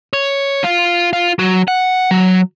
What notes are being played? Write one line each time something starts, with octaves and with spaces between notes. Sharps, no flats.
C#5
F4
F4
F#3
F#5
F#3